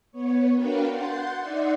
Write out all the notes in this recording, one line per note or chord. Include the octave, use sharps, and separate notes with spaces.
B3 C#5
D4 F#4 A#4 B4 F5 G5
F#5 C6 G6 A6
D#4 D5 E5 F#5 C6